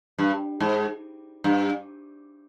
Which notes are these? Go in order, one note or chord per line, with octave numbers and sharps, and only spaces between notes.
G2
G#2
G2